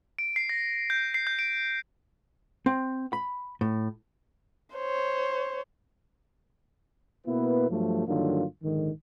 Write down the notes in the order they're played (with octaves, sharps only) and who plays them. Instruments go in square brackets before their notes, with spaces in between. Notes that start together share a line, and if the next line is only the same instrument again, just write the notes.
[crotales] D7
C7
A#6
G6
C7
G6
D7
[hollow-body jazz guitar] C4
B5
A2
[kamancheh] C5 C#5
[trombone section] B2 A#3 B3 E4 B4
G2 F3 F#3 A3
G2 D3 D#3 F#3 A#3 F4
A#1 G#2 D3 D#3